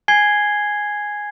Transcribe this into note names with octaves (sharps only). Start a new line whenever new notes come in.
G#5 G#6 C7 G7